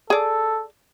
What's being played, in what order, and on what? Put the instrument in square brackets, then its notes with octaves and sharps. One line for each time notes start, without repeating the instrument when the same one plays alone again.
[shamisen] G#4 D5 [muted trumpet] A4